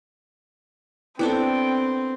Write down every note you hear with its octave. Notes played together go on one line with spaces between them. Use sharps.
B3 C4 D4 E4 A4 G5